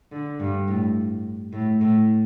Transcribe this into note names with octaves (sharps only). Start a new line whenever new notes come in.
D3
G2
A2
A2
A2